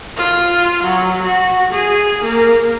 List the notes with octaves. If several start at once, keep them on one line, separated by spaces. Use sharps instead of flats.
F4
F#3
F#4
G#4
A#3